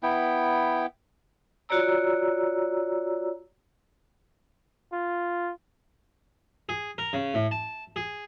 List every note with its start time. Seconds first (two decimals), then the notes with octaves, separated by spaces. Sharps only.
0.03 B3 E4 G5
1.69 F4 F#4 C#5 D5 A#5 E6
4.92 F4
6.69 G#4
6.98 A#4
7.13 C#3
7.34 A2
7.51 A5
7.96 G#4